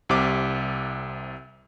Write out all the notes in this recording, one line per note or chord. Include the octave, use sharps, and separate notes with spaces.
C2 C3 D6